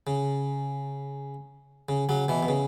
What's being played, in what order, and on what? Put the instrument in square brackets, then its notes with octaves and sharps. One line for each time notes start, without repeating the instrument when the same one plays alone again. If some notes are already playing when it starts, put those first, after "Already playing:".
[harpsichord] C#3
C#3
C#3 F#3
B2 E3
B2
C#3